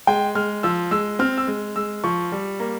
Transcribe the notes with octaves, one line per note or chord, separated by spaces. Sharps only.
G#3 G5
G#3 F6
F3 E6
G#3 E6
C4 F6
E6
G#3
G#3 E6
F3 C#6
G3
A#3